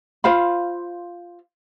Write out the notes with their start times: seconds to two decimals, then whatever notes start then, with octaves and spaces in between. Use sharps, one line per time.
0.24 F4 C5 F5 B5